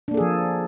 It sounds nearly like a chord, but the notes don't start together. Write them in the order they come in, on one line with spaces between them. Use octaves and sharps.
D4 A#3 A4 G#4 F3